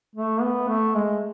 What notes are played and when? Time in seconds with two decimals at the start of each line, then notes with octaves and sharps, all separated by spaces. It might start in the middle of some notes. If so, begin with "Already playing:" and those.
0.16 A3
0.42 B3
0.68 A3
0.95 G#3